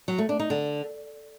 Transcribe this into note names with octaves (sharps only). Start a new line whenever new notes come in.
F#3
A3
D4
D#4
D3